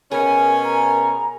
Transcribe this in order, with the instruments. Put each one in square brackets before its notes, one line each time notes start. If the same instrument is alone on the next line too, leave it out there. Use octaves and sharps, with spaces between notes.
[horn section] B2 C#4 [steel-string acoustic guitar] G#4 [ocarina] A#4
[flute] A#5